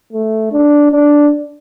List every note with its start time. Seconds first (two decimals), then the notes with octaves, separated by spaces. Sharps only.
0.13 A3
0.52 D4
0.92 D4